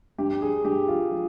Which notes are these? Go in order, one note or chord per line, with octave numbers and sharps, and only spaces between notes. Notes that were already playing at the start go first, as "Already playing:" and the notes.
G2 G4
G#4
G2 G4
F4
F3